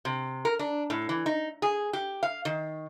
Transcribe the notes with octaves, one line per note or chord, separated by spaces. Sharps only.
C3
A#4
D4
A2
E3
D#4
G#4
G4
F5
D#3